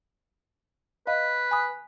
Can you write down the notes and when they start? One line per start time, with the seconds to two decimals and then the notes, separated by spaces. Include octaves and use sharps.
1.07 B4 D#5 F5 B5
1.51 G#5 B5 D#6